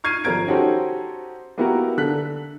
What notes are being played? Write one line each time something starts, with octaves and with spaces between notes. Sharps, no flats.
C#6 F6 G#6 C7 D#7
G#1 F3 A#4 G#6 D7
C#4 D#4 F#4 G4 A4 C5
A#3 B3 E4 F#4 G4 A#4
D3 A4 F#6 B6